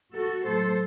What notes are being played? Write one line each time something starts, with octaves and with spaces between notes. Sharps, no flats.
F#4 A4
A2 F#3 A4 C5